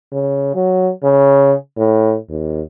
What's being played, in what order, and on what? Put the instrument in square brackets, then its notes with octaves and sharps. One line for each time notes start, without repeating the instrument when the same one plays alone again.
[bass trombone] C#3
F#3
C#3
A2
D#2